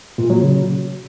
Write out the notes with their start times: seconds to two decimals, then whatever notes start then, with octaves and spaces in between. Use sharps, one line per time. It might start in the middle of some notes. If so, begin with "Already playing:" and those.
0.18 A#2
0.30 F#3
0.41 C#3